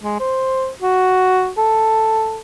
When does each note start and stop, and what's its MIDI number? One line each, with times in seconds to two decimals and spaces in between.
0.04 0.17 56
0.20 0.69 72
0.82 1.50 66
1.58 2.40 69